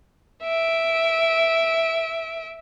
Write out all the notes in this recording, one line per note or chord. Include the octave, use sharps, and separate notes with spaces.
E5 D7